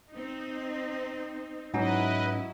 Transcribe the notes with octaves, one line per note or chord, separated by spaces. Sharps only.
C4 D#4
G#2 F#3 C#4 E4 B4 D#5